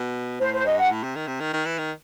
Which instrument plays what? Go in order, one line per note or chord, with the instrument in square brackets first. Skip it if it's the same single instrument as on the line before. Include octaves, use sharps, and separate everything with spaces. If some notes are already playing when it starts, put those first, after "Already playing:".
Already playing: [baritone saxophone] B2
[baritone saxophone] A2 [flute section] C5
[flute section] C5
[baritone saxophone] G2 [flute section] D#5
[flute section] F#5
[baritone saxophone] A2
C3
D#3
C3
D#3
D#3
E3
D#3